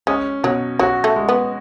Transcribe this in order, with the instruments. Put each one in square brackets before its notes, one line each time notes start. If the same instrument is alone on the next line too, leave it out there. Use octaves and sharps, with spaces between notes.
[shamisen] G#3 [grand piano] C#4
[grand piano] B2 [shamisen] F#3
[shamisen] F#3 [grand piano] F#4
[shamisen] A3
[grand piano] G#3
[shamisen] B3